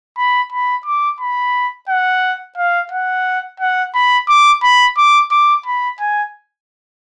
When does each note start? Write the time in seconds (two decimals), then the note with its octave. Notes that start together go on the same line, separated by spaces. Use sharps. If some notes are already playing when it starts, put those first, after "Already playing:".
0.18 B5
0.52 B5
0.86 D6
1.21 B5
1.89 F#5
2.58 F5
2.92 F#5
3.60 F#5
3.94 B5
4.28 D6
4.63 B5
4.97 D6
5.31 D6
5.66 B5
6.00 G#5